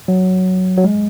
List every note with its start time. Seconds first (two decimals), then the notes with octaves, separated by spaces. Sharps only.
0.08 F#3
0.77 F#3
0.84 G#3